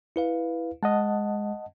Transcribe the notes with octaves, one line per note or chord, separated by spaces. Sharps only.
E4 B4 F5
G#3 D#5 F#5 A5